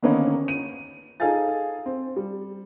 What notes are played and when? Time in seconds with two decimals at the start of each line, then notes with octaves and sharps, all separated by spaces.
0.03 D3 D#3 A#3 B3 C#4 D#4
0.48 D#7
1.20 D#4 G#4 A4 F5 G#5 A6
1.86 C4
2.16 G3